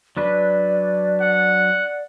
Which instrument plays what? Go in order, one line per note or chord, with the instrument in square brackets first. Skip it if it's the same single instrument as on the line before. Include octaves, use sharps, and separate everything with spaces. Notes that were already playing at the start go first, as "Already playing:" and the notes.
[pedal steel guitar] F#3 D4 B4 [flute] D5
[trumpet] F#5